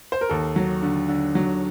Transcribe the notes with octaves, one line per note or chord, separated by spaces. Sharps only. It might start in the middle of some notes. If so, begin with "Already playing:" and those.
C5
A#4
D#2 A4
F#3
D3
D3
F#3